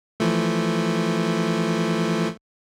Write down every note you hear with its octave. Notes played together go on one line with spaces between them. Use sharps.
E3 F3 A3